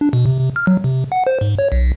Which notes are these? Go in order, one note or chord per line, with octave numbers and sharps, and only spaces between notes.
D4
B2
C3
C3
F6
F#3
C3
F#5
C5
G#2
C#5
B1